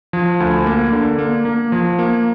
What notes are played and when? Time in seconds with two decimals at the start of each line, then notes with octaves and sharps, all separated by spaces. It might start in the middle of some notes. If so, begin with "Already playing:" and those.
0.13 F3
0.40 D2
0.66 A#3
0.92 D3
1.19 A#3
1.45 A#3
1.72 F3
1.99 A#3